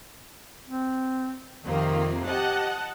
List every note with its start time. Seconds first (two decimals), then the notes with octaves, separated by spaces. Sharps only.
0.67 C4
1.64 F2 C3 D#3 A#3
2.27 G4 D#5 F#5 A5